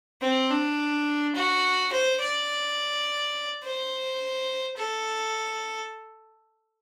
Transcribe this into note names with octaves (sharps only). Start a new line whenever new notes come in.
C4
D4
F#4
C5
D5
C5
A4